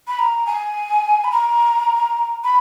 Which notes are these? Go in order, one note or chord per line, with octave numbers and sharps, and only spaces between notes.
B5
A#5
G#5
B5
A#5
B5